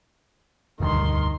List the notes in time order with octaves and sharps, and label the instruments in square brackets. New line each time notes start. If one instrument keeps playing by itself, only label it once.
[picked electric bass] E1 D2 G2 [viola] D#3 C6